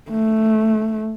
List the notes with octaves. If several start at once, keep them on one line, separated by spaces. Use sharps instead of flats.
A3